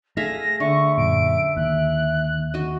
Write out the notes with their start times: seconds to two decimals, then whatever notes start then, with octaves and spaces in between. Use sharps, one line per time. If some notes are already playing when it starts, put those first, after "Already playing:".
0.17 A3 G#4 E5 F5 A#6
0.60 D3 E5 C#6
0.98 F#2 A#2 D7
1.57 D#2 F#6
2.54 F#4 D#5